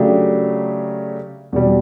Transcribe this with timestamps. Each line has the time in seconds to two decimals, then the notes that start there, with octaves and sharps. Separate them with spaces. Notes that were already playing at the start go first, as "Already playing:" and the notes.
Already playing: C#3 F#3 A3 D4 G4
1.53 E2 B2 G3